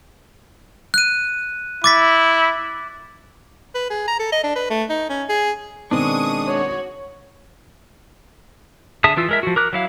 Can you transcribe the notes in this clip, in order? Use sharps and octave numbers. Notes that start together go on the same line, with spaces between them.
F#6 D#7
E4 D6 A6 B6
B4
G#4
A#5
A4
D#5
D4
B4
A3
D#4
C#4
G#4
B2 D#3 G#3 C4 D4 C#6 D#6
F#4 C#5
D3 G#4 E5 A5 D#6
E3 F4 E6
G#3 A#4 E5
F3 F#4
A#4 D6 F#6
F#3 E4 F5